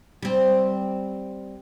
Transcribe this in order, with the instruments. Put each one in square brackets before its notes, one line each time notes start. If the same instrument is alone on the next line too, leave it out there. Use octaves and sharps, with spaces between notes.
[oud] G3 C4